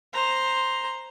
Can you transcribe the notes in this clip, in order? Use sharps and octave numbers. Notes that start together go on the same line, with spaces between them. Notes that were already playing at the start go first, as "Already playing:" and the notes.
C5 A#5